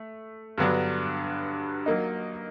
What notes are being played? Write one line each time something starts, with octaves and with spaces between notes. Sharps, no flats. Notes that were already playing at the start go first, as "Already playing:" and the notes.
Already playing: A3
G2 D3 F#3 B3 D4
F#3 A#3 D#4